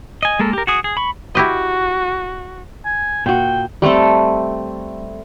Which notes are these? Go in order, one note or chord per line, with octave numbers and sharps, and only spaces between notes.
D#5 G#5
G#3 A#3 A4 A#4
G4 A#4
F#4 G#4 D#6
G#4
B5 C#6
E4 F#4 G4 D#5
G#5
A#2 F#4 G5
G3 A3 C4 A4